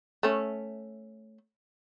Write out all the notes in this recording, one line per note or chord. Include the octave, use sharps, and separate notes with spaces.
A3 C#4